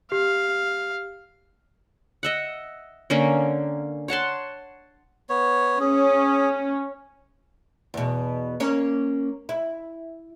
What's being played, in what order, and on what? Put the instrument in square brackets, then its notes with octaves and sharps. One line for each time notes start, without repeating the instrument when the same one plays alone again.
[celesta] G4 [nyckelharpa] F5
[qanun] D#5 E5 F#5
D3 A#3 C#4
C#5 F#5 A5 C6
[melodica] B3 C#5
[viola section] C#4 [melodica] G#4
[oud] E2 B2
A#3 C#4 C#5
E4